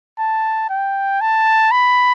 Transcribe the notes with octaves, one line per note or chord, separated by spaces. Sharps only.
A5
G5
A5
B5